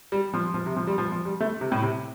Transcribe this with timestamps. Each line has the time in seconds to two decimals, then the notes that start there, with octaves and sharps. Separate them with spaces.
0.12 G3
0.34 F3
0.54 F3
0.66 C3
0.76 F3
0.87 G3
0.98 F3
1.12 F3
1.25 G3
1.40 A3
1.61 C3
1.72 A2
1.82 C3